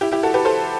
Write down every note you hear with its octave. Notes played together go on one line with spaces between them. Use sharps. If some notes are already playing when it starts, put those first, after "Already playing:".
E4 G4
E4 G4
F#4 A4
G4 B4
A4 C5